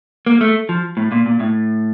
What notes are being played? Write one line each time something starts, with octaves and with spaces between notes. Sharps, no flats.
A#3
A3
F3
A2
A#2
A#2
A2